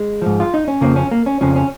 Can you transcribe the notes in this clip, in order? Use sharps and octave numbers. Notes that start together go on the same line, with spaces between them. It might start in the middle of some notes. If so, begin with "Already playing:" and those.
Already playing: G#3
G#2 F3
F4
D#4
C#4
F2 C#3 F3 A#3
C#4
A#3
C#4
F2 C#3 F3 C#4
C#4